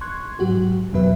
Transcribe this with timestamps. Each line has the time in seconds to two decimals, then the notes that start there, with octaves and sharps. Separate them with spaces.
0.01 C6 C#6 F#6 G#6
0.39 G#2 F#3 F#4 G4
0.93 E2 G2 B2 F#3 B4 E5